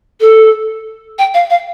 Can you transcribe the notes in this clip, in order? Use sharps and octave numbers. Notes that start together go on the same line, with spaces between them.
A4
G5
F5
F5